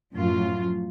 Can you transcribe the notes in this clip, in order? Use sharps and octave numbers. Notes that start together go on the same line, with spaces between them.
F#2 A2 F3 F#3 F4